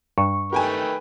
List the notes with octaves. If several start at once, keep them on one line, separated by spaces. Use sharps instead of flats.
G2 C#6
D#3 A3 G4 B4 G5 G#5